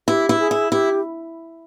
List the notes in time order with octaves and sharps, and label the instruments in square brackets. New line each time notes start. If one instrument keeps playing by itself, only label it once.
[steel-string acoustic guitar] E4 [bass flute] G4
[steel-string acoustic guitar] E4
[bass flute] G#4
[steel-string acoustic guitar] E4
[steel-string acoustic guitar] E4 [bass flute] G4